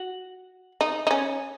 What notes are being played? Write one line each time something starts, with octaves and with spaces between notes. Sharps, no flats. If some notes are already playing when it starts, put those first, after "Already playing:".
Already playing: F#4
D#4
D#4
C#4